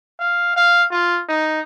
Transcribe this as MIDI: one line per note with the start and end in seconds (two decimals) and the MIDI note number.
0.19 0.54 77
0.56 0.83 77
0.91 1.21 65
1.29 1.61 63